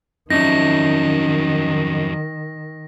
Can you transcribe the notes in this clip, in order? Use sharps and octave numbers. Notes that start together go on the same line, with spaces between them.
F2 D#3 F#3 C#4 D#4 A#6